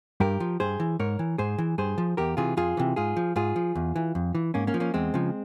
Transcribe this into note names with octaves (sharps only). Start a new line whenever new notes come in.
G2 G4 A#4
F3
G2 G#4 C5
E3
G#2 A#4 C#5
E3
G#2 G#4 C5
E3
G2 G#4 C5
F3
E2 G4 A#4
C3 E3 F4 G#4
F2 F4 G#4
C3 E3
G#2 F4 G#4
F3
G#2 F4 G#4
F3
E2
E3
F2
E3
G#2 A#3 C#4
A#3 C#4
F3
A#3 C#4
E2 G#3 C4
C#3 F3